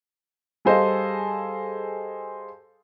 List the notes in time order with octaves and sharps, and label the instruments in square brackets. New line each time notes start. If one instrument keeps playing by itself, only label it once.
[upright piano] G3 G#4 A4 C5 D#5 F5